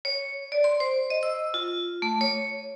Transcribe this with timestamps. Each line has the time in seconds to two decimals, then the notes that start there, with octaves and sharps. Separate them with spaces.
0.05 C#5
0.52 D5
0.64 C6
0.80 C5
1.10 D#5
1.23 E6
1.54 F4
2.02 A3
2.21 C#5